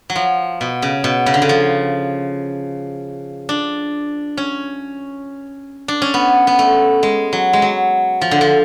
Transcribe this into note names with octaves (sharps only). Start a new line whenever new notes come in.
F#3
F3
B2
C#3
B2
C#3
D3
C#3
F3
D4
C#4
D4
C#4
B3
B3
A3
G#3
F#3
G#3
F#3
F3
D3
F3